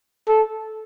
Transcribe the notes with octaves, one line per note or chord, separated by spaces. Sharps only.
A4